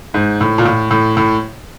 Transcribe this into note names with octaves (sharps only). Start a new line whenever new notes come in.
G#2
A2
A#2
A2
A2
A2